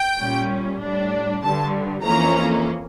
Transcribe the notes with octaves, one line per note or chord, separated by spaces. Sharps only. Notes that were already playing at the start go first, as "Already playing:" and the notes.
Already playing: G5
A#2 G3 C#4
A2 G3 D4
G2 D3 G3 A5
F2 E3 A#3 C#4 A#5